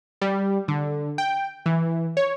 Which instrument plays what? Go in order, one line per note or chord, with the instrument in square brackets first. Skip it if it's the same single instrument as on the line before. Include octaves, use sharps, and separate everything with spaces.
[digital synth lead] G3
D3
G5
E3
C#5